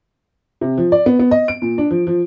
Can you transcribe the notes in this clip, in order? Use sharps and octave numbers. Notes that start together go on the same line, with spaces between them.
C3
F3
D5
B3
B3
D#5
D7
A#2
D4
F3
F3